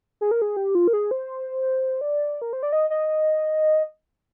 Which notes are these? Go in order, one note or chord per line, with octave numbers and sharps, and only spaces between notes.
G#4
A#4
G#4
G4
F4
A#4
G#4
C5
D5
A#4
C5
D5
D#5
D#5